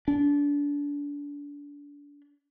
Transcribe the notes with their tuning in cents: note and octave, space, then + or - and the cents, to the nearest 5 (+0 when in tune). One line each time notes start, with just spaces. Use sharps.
D4 -30